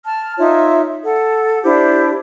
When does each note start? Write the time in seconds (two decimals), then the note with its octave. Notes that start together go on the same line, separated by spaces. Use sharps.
0.05 A5 F6
0.39 D#4 F4 C#5 E5
1.05 A4 F#5
1.63 D4 E4 G4 C5